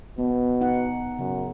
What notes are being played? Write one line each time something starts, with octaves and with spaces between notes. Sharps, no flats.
B2 B3
D#4 F#5
F#2 C#3